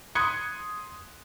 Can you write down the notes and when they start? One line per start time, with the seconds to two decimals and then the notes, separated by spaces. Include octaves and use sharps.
0.15 C6 D#6 F#6 G#6 C#7